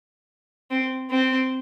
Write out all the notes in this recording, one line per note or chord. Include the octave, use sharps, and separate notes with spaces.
C4
C4